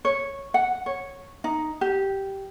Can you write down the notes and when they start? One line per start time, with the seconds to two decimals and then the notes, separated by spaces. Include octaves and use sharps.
0.05 C#5
0.54 F#5
0.86 C#5
1.44 D#4
1.81 G4